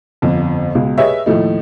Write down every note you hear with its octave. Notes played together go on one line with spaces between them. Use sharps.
G1 F2
C#2 B2 G#3
G4 G#4 B4 C#5 D#5 E5
D#2 A2 F3 A3 D#4